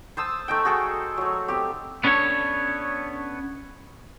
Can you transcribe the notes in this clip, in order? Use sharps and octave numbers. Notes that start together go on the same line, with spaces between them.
C5 A5 D#6 E6
A3 D#4 G5
F#4 G#4 A4 G5
F#3 A3
C4 G4
B3 C#4 D4 A4 C#5